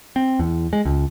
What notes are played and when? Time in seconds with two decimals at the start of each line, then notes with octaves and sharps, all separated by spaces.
0.16 C4
0.39 E2
0.73 G#3
0.85 C#2